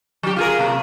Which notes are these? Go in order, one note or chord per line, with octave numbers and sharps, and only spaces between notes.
F#3 G4
F4 G#4 A#4
C3 A#3